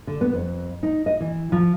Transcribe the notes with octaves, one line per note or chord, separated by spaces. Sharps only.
D3
B3
F2
D#4
D#5
E3
F3